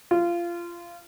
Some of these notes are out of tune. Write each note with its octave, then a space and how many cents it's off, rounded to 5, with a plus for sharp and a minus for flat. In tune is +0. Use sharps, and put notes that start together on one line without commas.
F4 -20